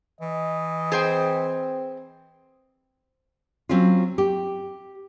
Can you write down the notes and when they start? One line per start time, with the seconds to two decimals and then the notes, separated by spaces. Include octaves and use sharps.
0.21 E3 D#5
0.92 C4 G#4 C5 G5
3.69 F#3 C4 C#4 F4
4.18 G4